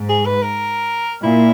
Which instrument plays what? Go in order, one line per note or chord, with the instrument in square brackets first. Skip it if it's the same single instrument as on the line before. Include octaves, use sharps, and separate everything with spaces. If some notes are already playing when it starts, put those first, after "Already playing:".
Already playing: [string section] G#2
[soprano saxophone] G#4
B4
A#4
[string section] A#2 [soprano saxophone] E4